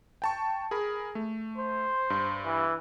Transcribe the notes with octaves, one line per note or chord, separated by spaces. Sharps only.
G5 A5 C#6
G#4 A#4 B5
A3
C5
G2
E3